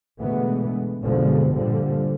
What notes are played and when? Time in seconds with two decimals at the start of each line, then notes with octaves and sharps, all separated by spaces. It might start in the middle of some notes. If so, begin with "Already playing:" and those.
0.20 B2 D3 E3 G#3 A3 B3
1.00 G1 C2 B2 D3 F3 G#3
1.54 A#2 D3 F3 G3